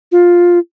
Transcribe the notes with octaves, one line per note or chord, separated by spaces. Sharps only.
F4